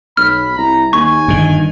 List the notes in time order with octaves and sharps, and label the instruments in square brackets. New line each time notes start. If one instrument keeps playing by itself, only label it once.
[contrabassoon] B1 [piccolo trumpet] B5 [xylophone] F6
[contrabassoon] C2 [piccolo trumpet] A#5
[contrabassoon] D#2 [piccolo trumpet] G#5 [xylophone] C#6
[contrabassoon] G1 [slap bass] G2 D#3